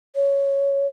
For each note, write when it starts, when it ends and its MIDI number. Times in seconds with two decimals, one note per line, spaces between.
0.15 0.87 73